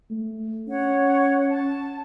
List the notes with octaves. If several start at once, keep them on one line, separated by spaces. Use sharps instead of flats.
A3
C#4 C#5 F#5
A5